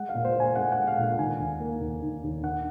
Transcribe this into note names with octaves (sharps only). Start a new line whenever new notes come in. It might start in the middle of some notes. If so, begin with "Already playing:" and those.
Already playing: G#3 F#5
F5
A#2
C5
A#2 G#5
G#3 F#5
G#3 F#5
F5
A#2
F#5
D#3 G#5
D#2
A#3
D#2
D#3
D#2
D#3 F#5